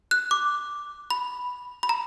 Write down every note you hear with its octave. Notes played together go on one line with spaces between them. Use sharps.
F#6
D6
B5
B5
A#5